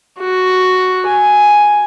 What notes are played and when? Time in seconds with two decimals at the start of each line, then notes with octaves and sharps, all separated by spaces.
0.20 F#4
1.07 G#5